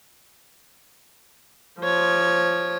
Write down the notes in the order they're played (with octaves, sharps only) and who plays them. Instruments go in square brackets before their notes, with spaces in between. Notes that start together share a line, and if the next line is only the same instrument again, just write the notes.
[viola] F3 C#5